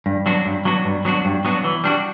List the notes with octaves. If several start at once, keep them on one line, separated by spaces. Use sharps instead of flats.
G2
F#3 B3 D4 F#4
G2
F#3 B3 D4 F#4
G2
F#3 B3 D4 F#4
G2
F#3 B3 D4 F#4
E3
G3 D4 F#4